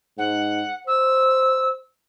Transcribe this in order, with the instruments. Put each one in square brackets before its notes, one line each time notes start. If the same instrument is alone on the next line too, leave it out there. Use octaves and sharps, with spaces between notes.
[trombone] G#2 [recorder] F#5
[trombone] C5 [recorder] E6